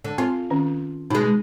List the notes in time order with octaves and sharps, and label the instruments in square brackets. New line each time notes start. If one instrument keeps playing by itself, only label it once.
[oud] D3
[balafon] C4 [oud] F4
[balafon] D#3 C#4
[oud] B2 G#3 [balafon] D#4